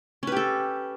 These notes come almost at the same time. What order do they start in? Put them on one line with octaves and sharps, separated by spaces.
C#4 B4 G4 A4